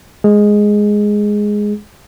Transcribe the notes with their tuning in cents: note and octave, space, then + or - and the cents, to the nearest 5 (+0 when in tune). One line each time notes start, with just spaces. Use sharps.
G#3 +0 G#4 +0